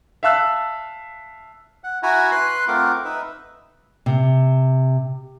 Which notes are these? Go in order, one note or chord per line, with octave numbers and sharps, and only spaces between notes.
E5 F5 A5 E6 F#6
F#5
E4 F#4 E5 F#5 G#5 A#5
B4 C6 F#6
A3 C4 F4 A#4 F#5 D6
D#4 B4 E5
C3